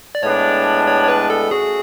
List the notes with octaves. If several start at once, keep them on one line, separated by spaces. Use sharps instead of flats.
D5
A2 G#3 B3 D4 C#5
C#5
C#5
B4
A4
A3 C#4 F#4 G#4